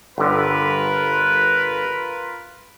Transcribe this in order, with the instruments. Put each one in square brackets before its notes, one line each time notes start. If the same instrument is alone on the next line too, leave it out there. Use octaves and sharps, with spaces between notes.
[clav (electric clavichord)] G1 D3 [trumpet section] F4 A#4 B4